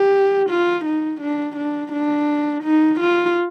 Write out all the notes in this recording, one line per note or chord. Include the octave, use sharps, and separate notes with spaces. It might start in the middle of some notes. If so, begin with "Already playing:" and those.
Already playing: G4
F4
D#4
D4
D4
D4
D#4
F4